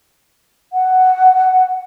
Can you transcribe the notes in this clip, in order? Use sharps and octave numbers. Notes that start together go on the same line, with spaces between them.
F#5